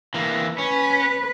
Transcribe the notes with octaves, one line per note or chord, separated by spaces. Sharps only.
E3 A#3
C#4 B4